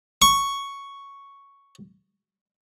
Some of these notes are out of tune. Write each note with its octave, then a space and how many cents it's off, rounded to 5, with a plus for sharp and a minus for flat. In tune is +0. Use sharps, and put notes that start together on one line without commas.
C#6 +0